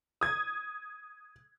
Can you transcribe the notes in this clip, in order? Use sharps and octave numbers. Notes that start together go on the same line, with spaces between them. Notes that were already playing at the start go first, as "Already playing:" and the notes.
D#6 G#6